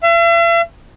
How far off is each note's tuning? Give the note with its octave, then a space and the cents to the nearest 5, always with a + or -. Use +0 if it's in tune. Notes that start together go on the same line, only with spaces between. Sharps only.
E5 +45